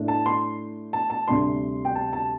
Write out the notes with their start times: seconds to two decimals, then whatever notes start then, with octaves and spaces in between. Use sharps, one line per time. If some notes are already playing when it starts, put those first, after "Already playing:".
Already playing: A2 A3 D4
0.08 A5
0.26 C6
0.93 A5
1.10 A5
1.28 D2 C3 G3 D4 C6
1.85 G5
1.95 A5
2.13 A5